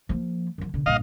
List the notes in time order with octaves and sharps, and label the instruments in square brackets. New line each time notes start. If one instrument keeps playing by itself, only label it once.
[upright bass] F3 A#3
D#3 F3
B2 D3
[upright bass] A#1 G2 [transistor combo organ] D#5 F5